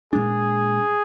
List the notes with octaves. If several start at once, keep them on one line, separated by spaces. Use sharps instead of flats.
A#2 G#3 D4 G#4